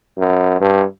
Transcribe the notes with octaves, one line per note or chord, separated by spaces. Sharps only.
F#2
G2